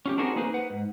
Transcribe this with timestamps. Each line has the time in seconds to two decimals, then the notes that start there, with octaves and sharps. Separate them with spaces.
0.06 C#4 F4 G4
0.17 C4 D4 D#4 F#4 G#4 A#4
0.36 A#3 D#4 G#4 B4 C5
0.54 B4 F#5
0.70 G#2